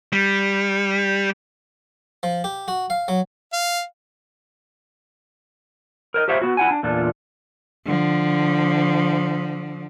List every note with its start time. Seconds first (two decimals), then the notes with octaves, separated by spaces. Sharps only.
0.13 G3
2.23 F3
2.44 G4
2.68 F#4
2.90 F5
3.08 F#3
3.53 F5
6.14 A#4 C5 D#5
6.28 G4 C5 C#5 E5 F5
6.42 B3 F#4
6.57 E4 F#5 G#5
6.71 D4
6.83 E2 A#2 D4 F4 A4
7.85 D3 F3